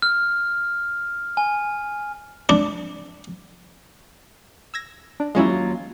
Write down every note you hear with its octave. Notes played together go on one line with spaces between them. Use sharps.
F6
G#5
D4
E6 G#6 A#6
D4
D#2 F#3 G#3 C#4 E4 F4